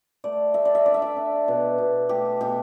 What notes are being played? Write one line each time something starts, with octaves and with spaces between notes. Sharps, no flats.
A3 D5
A3 E5
D5
E5
D4 D5
E5
D5
D4
B2
B2
A3 G4
B2 G4